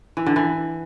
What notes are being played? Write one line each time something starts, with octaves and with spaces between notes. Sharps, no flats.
E3
D3
E3